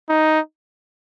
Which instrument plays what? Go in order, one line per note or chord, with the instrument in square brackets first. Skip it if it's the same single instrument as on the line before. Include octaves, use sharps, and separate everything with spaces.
[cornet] D#4